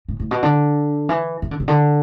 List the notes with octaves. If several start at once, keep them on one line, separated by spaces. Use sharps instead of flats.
A2
A2
B2
D3
E3
E3
D3
B2
D3